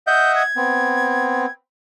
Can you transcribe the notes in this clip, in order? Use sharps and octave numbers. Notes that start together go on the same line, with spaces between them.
D#5 E5 F#5 G6
G#6
B3 C4